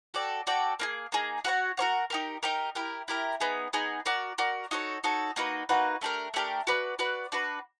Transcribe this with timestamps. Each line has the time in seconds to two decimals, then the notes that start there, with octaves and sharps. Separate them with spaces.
0.14 F#4 A4 D5 G5
0.47 F#4 A4 D5 G5
0.79 A#3 D#4 G#4
1.12 A#3 D#4 G#4
1.44 F#4 A#4 C#5 F#5
1.77 F#4 A#4 C#5 F#5
2.10 D#4 G4 A#4
2.43 D#4 G4 A#4
2.75 E4 G4 A#4
3.08 E4 G4 A#4
3.40 B3 D#4 G#4
3.73 B3 D#4 G#4
4.06 F#4 A#4 D5
4.38 F#4 A#4 D5
4.71 D#4 F#4 A4 C#5
5.04 D#4 F#4 A4 C#5
5.36 A#3 D#4 F#4 B4
5.69 A#3 D#4 F#4 B4
6.01 A3 D4 G4 A#4
6.34 A3 D4 G4 A#4
6.67 F#4 B4 D5
6.99 F#4 B4 D5
7.32 D4 F#4 B4